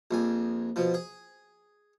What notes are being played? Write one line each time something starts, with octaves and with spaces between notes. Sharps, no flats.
A#1 F2 G#5
B2 F3
G#4